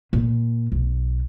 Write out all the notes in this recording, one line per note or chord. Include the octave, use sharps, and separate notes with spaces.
A#2
B1